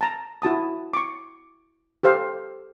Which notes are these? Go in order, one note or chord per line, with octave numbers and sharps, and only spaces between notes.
A5 A#5
E4 F#4 A5 D#6
C#6 D6
G4 A4 C5 F5